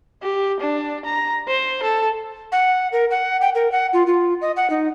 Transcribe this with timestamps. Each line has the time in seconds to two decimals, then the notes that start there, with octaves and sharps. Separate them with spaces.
0.23 G4
0.60 D4
1.05 A#5
1.48 C5
1.83 A4
2.52 F#5
2.92 A#4
3.11 F#5
3.41 G5
3.55 A#4
3.72 F#5
3.93 F4
4.07 F4
4.42 D#5
4.57 F#5
4.70 D#4